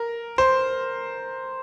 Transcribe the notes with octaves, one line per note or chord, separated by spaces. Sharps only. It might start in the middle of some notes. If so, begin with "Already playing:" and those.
Already playing: A#4
C5